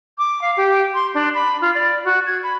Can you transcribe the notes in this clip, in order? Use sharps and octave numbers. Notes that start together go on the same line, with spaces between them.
D6
F5
G4
C6
D4
B5
F4
D5
F#4
G#6
B5